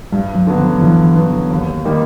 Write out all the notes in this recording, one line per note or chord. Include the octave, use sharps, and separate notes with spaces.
G2 G3
F#3
D3 F#3 B3
F3
G2 E3
D3 F#3 B3
D#2
D#3 G3 A#3 D#4